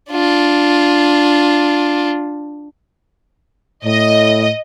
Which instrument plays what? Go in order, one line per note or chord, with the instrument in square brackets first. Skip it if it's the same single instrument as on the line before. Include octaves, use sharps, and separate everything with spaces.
[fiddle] D4 F4
[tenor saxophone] A2 [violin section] D#5